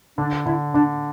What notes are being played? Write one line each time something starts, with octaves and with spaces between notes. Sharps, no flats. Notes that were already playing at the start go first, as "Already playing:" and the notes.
D3 D4
D3 E4
D3 D4